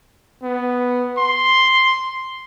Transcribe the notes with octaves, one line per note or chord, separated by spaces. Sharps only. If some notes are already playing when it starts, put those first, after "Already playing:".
B3
C6